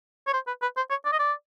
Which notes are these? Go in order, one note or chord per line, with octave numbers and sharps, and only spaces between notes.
C#5
C5
B4
B4
C5
C#5
D5
D#5
D5